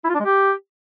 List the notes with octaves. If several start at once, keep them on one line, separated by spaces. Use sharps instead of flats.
E4
F4
D4
G#3
G4